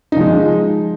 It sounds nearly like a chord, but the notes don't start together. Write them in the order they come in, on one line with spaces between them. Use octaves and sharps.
D#4 F3 G#3